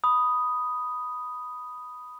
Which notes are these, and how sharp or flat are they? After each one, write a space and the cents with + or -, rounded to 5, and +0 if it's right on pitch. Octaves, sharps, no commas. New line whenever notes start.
B5 +0 D#6 +0